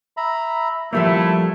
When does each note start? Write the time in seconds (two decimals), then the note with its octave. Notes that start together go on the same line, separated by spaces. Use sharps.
0.17 E5 A#5 B5
0.93 F3 G3 A3 A#3 E4 E5